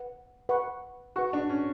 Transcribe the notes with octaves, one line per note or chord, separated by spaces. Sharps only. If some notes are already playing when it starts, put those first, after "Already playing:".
Already playing: B4 F#5
B4 F#5 C#6
F#4 B4 F#5 C#6
D4
C#4